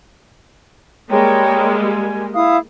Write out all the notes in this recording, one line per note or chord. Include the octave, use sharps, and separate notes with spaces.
G3 G#3 A#3 C#5 G5 A#5
G#5
E4 F5 D#6